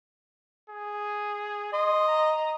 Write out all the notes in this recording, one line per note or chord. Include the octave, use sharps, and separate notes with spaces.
G#4
D#5 C6
A#5